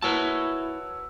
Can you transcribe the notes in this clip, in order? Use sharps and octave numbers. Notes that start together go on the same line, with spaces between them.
E4 F#4 A#4 B4 C#5 A5 E6